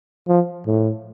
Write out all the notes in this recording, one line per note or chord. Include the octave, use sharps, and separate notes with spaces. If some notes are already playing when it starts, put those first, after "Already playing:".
F3
A2